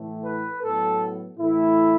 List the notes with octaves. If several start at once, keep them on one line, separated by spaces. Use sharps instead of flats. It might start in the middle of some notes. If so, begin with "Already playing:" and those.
Already playing: A2 E3 A3
B4
A2 F#3 B3 A4
A2 E3 A3 E4